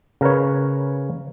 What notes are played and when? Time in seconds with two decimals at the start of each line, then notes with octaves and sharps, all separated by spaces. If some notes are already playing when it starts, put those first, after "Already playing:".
0.21 C#3 A#4 B4 C#5